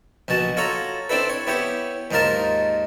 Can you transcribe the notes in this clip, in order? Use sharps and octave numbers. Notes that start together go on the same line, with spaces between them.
A#1 B2 F#4 A5
F4 F#4 A4 C#5 A#5
C4 D4 E4 A4 B4
C#5
B3 E4 G4 C#5
D#2 G#2 D#4 F4 A#4 A5